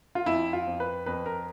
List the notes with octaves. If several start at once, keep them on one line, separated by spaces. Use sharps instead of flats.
F4
F2 E4
F4
F2
B4
F2 B4
A#4